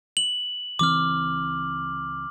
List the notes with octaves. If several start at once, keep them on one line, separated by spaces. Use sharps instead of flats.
F#7
C#2 E3 C4 D6 F6